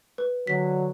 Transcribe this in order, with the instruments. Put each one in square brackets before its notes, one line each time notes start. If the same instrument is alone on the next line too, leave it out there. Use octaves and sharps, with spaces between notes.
[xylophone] B4
[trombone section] D3 F#3 [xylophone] B6